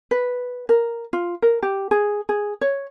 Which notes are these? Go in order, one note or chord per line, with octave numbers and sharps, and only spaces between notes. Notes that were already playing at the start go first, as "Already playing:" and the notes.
B4
A#4
F4
A#4
G4
G#4
G#4
C#5